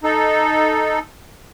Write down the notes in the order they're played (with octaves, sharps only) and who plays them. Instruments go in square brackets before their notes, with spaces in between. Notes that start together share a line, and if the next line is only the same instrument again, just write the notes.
[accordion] D#4 A4